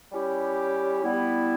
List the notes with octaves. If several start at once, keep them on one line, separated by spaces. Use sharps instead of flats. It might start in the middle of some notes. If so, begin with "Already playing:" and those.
G3 C#4 E4 G4
G3 B3 E4